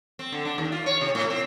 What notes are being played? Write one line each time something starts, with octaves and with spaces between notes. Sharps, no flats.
C4
D3
D4
D#2
F4
C#5
C3
A2
C4